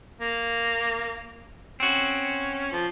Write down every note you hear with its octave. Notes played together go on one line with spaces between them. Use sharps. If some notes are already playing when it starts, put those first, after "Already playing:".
A#3
C4 C#4 F#4
F3